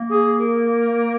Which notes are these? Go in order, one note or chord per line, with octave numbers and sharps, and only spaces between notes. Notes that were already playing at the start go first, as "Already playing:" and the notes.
Already playing: A#3
G#4
A#4